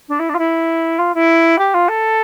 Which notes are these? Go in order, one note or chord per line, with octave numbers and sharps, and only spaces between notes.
D4
E4
D4
F4
E4
F4
E4
G4
F4
A4